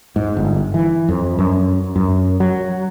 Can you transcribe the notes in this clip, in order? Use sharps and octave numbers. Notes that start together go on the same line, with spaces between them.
G#2
G1
E3
F2
F#2
F#2
F#3